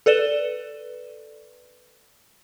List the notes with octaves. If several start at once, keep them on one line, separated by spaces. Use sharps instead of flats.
A4 B4 D5 E7 G7